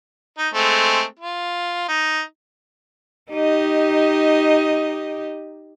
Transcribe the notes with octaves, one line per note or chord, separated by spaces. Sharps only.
D#4
G#3 A3 C4
F4
D#4
D#4 G4 D#5